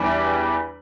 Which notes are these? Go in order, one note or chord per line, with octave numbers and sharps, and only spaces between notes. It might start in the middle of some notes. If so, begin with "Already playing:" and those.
Already playing: E2 E3 G3 D4